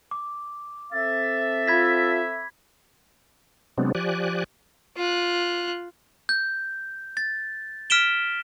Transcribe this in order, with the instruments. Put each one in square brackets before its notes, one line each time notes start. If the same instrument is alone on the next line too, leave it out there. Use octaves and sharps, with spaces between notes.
[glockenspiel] D6
[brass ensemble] C4 A4 E5 [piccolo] A6
[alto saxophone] F4 [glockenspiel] B5 G#6 B6
[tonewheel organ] C3 F#3 G#3 B3 C4 D4
F3 G4 D5 G#5 F#6
[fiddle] F4 F#6
[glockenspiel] G6
A6
F6 B6 D7 E7 G7